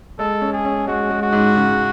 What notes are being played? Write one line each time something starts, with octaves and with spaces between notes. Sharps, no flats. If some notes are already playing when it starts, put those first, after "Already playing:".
G#3 A4
C#4
G#4
C#4
G#3 F#4
G#3
F#4
G#2
C#3